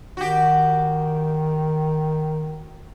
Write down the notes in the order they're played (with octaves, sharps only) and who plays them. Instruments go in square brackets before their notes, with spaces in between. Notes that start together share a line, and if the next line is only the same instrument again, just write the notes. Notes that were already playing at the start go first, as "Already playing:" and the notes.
[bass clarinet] D#3 [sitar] F#4 G4